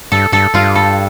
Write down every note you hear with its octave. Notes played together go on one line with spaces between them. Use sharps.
G2 A4
G2 A4
G2 F4
A4